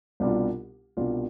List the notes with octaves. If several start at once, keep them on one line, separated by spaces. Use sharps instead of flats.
C2 B2 G3 D4 F4
C2 B2 G3 D4 F4